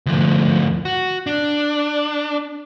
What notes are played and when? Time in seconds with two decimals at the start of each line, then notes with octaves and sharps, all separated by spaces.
0.06 D2 F3
0.85 F#4
1.27 D4